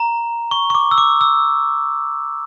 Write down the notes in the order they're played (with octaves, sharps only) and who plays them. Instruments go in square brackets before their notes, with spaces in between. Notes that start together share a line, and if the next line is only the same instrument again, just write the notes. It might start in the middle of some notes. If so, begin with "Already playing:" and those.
Already playing: [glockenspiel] A#5
C#6
C#6
D6
E6
D6
E6